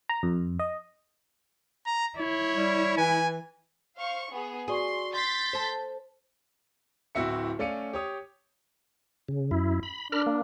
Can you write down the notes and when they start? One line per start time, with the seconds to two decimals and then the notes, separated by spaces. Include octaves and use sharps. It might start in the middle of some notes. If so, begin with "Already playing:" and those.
0.09 A#5
0.23 F2
0.59 D#5
1.86 A#5
2.19 E4 C#5
2.56 G3
2.98 E3 G#5
3.98 C5 F5 C#6
4.32 B3 G#4
4.68 F#4 G#4 D5 C6 C#6
5.14 C6 G6 A6 B6 C7
5.53 A4 C5
7.15 D1 C4 E4 F#4 E5 C#7
7.59 A3 C#4 D5 F5 C#7 D#7
7.93 G4 C#5 D#6
9.28 C#3
9.51 F#2 E4
9.83 B5
10.12 D4 A#4 B5 F6
10.26 A#3